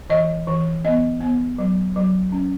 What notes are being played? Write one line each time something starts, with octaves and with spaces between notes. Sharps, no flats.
E3 D#5
E3
B3 D#5
B3
F#3
F#3
C#4